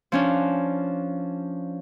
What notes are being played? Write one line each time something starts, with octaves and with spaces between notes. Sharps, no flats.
F3 C#4 D4